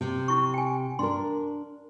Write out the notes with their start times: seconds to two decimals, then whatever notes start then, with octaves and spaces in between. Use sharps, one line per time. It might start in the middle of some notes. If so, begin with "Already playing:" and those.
0.01 C3
0.28 E4 C#6
0.54 G5 G#5
0.99 D4 A#4 C6